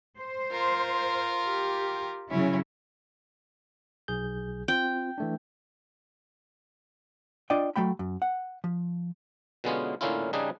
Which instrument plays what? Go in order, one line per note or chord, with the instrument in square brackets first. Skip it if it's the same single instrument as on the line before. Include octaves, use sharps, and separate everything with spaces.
[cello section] C5
[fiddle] F4 A#4
[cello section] G4
[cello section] C#3 F#3 E4 [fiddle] C#4
[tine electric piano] B1 G#4 G6
[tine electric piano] C4 F4 [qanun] G5
[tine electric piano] E3 A3 D4
[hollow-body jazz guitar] D4 F4 D5 D#5 G5
F#3 A3 G5 B5
F#2
F#5
F3
[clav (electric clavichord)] B2 D3 G#3 B3 C#4 F4
A2 D3 A#3 C#4 E4 F4
C#3 G3 D4 D#4 G#4